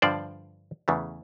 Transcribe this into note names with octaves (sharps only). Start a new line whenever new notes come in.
G2 D3 F3 C5 D5
E2 C#3 E3 A3